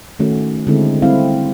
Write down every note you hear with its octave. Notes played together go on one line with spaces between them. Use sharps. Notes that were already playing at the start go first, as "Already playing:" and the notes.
D#3 A3 C#4 F#4
D3 G#3 C4 E4 A4
G3 C4 E4 F5